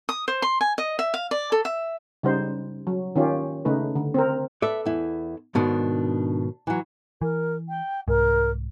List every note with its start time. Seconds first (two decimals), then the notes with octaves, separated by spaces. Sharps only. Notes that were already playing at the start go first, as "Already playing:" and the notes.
0.09 D#6
0.28 C5
0.42 C6
0.61 G#5
0.78 D#5
0.99 E5
1.14 F5
1.31 D5
1.52 A4
1.65 E5
2.23 C#3 G3 D#4 C5
2.87 F#3
3.16 D#3 C#4 F4 G4
3.65 C#3 A3 D#4 B4
3.95 D3
4.14 C4 A#4
4.62 A4 B4 D5 E5
4.86 E2 E4
5.55 G#2 B2 D#3 D4
6.67 E3 F#3
7.22 E3 A#4
7.69 G5
8.08 C2 G#2 A#4